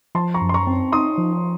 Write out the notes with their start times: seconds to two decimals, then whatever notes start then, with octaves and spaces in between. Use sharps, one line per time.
0.15 F3 A5 C6
0.34 A#5 C#6
0.41 F#2
0.49 C6
0.54 A#5 C#6
0.67 C4
0.92 D#4 C6 D#6
1.18 F3